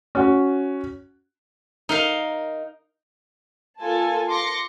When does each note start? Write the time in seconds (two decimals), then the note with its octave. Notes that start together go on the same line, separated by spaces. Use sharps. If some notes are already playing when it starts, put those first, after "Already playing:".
0.15 C#4 F#4
1.89 D#4 A#4 F5
3.80 A#3 F4 A4 G#5 A5
4.29 C6 D6 A#6 C#7